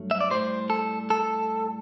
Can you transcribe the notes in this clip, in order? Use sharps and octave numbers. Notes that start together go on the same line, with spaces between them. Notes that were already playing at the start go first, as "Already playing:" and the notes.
Already playing: G2 F#3 A3
E5
D5
A2 G3 C5
A4
A4